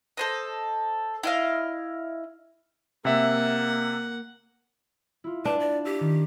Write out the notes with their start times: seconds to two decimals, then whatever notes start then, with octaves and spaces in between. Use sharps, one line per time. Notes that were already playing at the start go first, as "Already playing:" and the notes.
0.17 A4 C5 D#5
1.23 E4 D#5 F5
3.05 C3 A#3 E5 F#5
5.24 E4 F4
5.45 D4 B4
5.60 D5
5.85 G4 E6
6.00 D#3